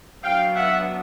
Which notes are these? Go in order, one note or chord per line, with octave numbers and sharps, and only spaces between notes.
F#3 B3 D4 F5 G5
E5 F#5